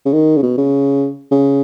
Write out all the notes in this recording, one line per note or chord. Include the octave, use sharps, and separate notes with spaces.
C#3
D#3
C#3
B2
C#3
C#3